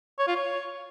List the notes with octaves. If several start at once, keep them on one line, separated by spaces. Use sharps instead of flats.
C#5
F4
C#5